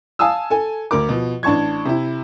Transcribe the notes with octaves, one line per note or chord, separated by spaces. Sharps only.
F5 G#5 A5 D#6 E6
A4 G#5
D2 A#4 D6
B2 F3
A1 D4 A5 C#6 G#6
C3 E4